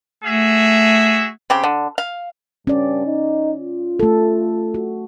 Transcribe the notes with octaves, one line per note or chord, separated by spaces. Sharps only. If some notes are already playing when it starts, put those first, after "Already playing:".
A3 F#4 G#4 E5
C#3 C4 G4
D3
F5
G2 C#4 D5
D#4
F4
A3 A4
F#4